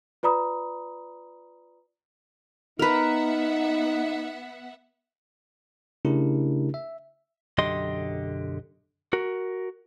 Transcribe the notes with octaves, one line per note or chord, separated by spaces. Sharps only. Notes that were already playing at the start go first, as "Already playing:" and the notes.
F4 B4 D5 A#5 B5 D#6
B3 D#4 A#4 B4 E5 F#5
C#3 A3 D4 E4 G4 A#4
E5
B1 F#2 D3 G4 D#5 C6
F#4 A#4